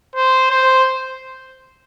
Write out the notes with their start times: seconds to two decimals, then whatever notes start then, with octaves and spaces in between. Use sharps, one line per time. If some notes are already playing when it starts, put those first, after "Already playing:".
0.15 C5
0.51 C5